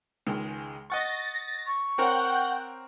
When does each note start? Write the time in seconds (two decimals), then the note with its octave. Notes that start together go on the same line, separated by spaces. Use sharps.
0.27 C#2 D#3 G#3
0.90 D#5 F#5 C#6 A6 A#6
1.66 C#6
1.98 C4 A#4 C#5 F#5 G5